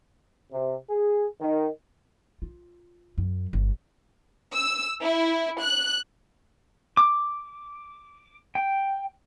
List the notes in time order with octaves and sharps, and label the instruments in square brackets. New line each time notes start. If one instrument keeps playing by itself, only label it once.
[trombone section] C3
G#4
D#3
[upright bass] F4
F#2
G1
[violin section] E6
E4
F#6
[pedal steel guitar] D6
G5